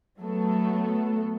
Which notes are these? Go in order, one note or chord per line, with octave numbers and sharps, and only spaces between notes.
F#3 A3 B3 A4